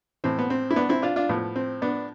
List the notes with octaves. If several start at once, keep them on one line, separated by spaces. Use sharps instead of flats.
A2 E3 C4
B3
C4
E4
B3 D4
C4 E4
D4 F4
D4 F4
A2 F3 B3
C4
B3 D4